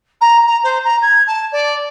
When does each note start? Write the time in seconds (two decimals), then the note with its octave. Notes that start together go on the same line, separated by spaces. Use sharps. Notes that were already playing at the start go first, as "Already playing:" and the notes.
0.21 A#5
0.47 A#5
0.64 C5
0.84 A#5
1.02 G#6
1.27 A5
1.52 D5